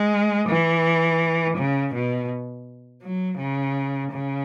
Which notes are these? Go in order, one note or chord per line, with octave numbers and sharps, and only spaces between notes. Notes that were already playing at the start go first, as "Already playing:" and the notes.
Already playing: G#3
E3
C#3
B2
F#3
C#3
C#3